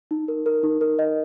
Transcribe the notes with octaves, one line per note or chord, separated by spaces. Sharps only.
D#4
A#4
A#4
D#4
A#4
D#5